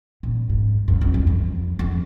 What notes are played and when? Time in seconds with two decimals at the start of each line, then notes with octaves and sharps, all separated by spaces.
0.23 A#2
0.50 G#2
0.88 F#2
1.01 F2
1.14 E2
1.27 F2
1.79 F2